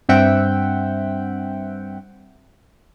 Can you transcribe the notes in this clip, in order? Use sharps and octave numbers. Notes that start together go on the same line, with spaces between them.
G2 C4 E5 F#5 G5